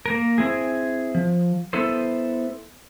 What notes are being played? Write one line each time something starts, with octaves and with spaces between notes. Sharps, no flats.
A#3 A#4
C4 E4 G#4
F3
B3 E4 A4 C5